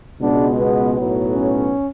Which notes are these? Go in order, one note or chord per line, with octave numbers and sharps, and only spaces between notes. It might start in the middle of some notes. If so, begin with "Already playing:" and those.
C#2 B2 G#3 B3 D4
B3
B1 A2 F#3 B3
C#4